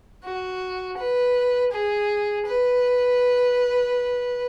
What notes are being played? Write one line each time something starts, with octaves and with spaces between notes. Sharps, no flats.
F#4
B4
G#4
B4